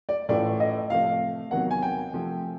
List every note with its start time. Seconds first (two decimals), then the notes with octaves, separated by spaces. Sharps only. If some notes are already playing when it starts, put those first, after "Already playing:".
0.09 D5
0.29 A2 E3 A3 C#4 F4 D5
0.60 D#5
0.90 C3 F3 A3 F5
1.51 E2 C3 D#3 F#3 F#5
1.71 G#5
1.82 G5
2.12 C3 F3 A3 C4